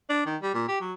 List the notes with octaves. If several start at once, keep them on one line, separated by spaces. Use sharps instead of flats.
D4
D#3
G3
A#2
G4
F#3